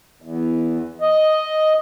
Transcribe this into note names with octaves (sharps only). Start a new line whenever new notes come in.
E2
D#5